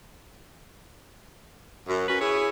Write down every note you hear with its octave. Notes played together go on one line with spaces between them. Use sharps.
F#2
C#4 F#4 B4
E4 G#4 C#5